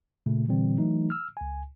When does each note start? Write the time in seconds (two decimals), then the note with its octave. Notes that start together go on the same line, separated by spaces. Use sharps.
0.26 A#2 C#3 A3
0.48 A#2 D3 E3 G3 C4
0.78 E3 F#3 A3 D#4
1.10 E6 F6
1.37 C#2 G#5